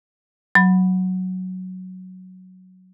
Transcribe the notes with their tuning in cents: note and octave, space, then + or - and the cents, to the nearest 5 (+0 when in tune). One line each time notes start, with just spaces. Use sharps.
F#3 +0 B5 +0